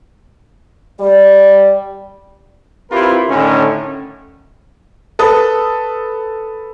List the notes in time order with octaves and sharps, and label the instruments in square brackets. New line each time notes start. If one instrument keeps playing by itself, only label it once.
[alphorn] G3 [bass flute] D5
[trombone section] C4 E4 F4 G4 A#4 B4
A2 D3 D#3 C#4
[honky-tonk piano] A4 B4 D#6